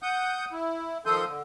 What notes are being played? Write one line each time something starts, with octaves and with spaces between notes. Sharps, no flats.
F#5 D#6 G6
E4
D#3 F3 A4 C6 D#6 G6
D3